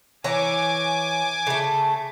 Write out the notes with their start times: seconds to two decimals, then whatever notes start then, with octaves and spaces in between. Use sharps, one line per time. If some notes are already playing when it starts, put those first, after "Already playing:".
0.24 E3 C#5 G#5 A#5 D6
1.47 C#3 A3